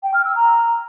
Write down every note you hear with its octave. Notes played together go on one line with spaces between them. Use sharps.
G5
F6
E6
A#5